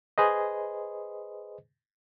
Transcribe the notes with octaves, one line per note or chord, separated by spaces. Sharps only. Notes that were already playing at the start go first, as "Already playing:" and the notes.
G#4 B4 C5 D#5